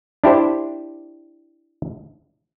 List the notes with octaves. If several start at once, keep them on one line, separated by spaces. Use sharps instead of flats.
D4 E4 G4 C5